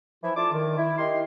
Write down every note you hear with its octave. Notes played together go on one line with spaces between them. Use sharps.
E3 F3 E4
A3 D4 F4 A5 D6
D#3
E4
D#4 G4 A#4 C6